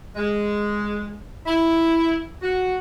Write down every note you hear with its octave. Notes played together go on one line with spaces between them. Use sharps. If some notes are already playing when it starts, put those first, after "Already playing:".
G#3
E4
F#4